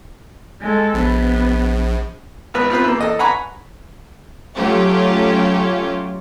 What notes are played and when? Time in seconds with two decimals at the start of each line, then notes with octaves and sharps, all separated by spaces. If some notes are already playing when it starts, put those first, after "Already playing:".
0.61 G#3 A4
0.94 A#1 B3
2.54 G#1 B3 B4
2.70 B3 C4 F4 B4
2.84 E3 A#3
3.01 A4 D#5
3.19 B4 F#5 G#5 A#5 B5 C#6
4.56 F#3 A3 C#4 F4 G4